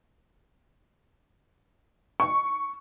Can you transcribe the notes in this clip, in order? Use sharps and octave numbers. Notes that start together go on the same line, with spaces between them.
C#6